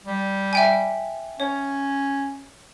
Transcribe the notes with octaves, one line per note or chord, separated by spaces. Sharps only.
G3
E5 G5 G#5
C#4 C#5